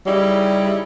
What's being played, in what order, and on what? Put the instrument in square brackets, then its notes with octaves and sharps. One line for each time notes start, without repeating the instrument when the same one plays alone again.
[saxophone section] C#3 D#4 E4 [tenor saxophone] G3